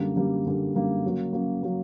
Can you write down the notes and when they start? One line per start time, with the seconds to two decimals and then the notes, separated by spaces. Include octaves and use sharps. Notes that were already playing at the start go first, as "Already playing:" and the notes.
Already playing: F#2 D3 G3 A#3
0.16 F#2 D3 G3 A#3
0.45 F#2 D3 G3 A#3
0.74 F#2 D3 G3 A#3
1.04 C#3 F#3 A#3
1.33 C#3 F#3 A#3
1.63 C#3 F#3 A#3